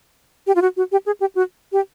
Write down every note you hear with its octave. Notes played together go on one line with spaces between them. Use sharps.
G4
F4
F#4
F#4
G4
G#4
G4
F#4
G4